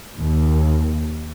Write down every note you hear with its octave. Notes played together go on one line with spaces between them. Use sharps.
D#2